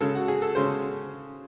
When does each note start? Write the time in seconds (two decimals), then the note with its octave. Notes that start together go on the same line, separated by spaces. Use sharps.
0.01 C#3 G#3 C#4 A4
0.15 F#4
0.28 G#4
0.42 A4
0.55 C#3 G#3 C#4 C5